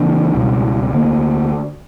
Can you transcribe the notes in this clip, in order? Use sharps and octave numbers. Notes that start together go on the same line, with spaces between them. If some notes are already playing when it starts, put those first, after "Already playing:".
Already playing: C#3 E3 A#3 D4
C#2 B2 G3
D2 D3 A#3